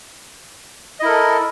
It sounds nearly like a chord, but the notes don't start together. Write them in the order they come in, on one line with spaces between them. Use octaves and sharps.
D#5 E4 A#4 A4